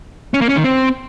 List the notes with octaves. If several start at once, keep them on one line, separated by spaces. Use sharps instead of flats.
C#4
A#3
C#4
D#3
C4